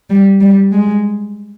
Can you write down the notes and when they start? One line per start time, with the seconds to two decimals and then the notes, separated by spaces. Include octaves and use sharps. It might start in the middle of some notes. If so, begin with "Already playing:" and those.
0.10 G3
0.41 G3
0.72 G#3